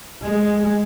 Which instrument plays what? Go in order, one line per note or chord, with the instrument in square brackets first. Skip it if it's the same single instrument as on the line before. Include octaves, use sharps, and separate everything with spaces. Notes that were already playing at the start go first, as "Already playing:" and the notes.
[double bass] G#3